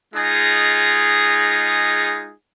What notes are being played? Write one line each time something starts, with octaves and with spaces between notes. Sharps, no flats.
G#3 D#4 F4 G#4